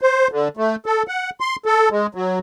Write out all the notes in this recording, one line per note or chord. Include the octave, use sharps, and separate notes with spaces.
C5
D3
A3
A4
F#5
C6
A4
G#3
F#3